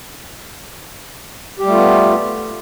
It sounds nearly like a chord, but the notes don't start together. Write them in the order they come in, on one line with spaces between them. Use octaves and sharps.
G4 G3 A3 F4 B3